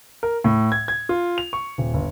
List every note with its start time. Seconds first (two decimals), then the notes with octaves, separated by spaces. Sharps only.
0.23 A#4
0.44 A2
0.72 G#6
0.88 G#6
1.09 F4
1.38 F7
1.53 C#6
1.78 D#1
1.94 G1